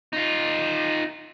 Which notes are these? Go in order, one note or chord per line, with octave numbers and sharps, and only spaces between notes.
D#4 F4